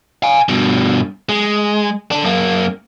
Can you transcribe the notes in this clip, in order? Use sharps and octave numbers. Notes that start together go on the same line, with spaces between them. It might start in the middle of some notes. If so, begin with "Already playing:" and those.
F5 G#5
G2 B2
G#3
D4 A4
F#2 A#3